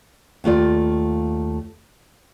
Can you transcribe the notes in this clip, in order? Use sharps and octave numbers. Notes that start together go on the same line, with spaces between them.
D#2 A3 F4 D5